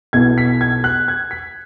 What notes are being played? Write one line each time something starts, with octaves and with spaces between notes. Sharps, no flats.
B1 B2 B3 E4 G#6
B6
G#6
F#6
G#6
B6